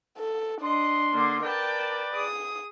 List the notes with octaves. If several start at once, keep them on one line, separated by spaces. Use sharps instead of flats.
A4
D4 D#5 C6
D3 A#3
A#4 B4 D5 G5 A5
G#4 D#6